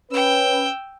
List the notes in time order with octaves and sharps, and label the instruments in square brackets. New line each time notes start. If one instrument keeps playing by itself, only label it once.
[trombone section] C#4 B4 [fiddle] G5 E6